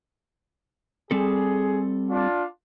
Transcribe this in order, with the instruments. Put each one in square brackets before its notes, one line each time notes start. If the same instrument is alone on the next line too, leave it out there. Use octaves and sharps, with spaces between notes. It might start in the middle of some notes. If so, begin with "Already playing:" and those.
[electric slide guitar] G3 C4 A4 [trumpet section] G#4
[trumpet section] D4 F4